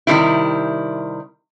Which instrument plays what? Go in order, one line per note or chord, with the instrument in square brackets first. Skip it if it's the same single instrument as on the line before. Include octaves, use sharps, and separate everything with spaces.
[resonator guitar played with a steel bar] C3 D#3 G3 E4